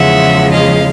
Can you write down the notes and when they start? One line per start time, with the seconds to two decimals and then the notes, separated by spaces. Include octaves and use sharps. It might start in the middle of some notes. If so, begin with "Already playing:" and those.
Already playing: E2 C#3 F3 G#3 E5 F#5
0.52 D#5 F5